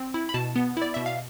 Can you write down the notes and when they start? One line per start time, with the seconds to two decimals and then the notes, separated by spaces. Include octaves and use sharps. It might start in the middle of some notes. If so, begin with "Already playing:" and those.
Already playing: C4
0.14 E4
0.29 B5
0.34 B2 A5
0.56 B3
0.77 E4 D5
0.94 B2 E5
1.06 F5